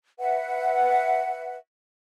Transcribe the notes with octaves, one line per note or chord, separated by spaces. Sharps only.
B4 E5 F#5